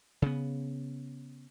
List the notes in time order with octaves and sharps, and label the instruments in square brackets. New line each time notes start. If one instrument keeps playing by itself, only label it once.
[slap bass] C#3 B3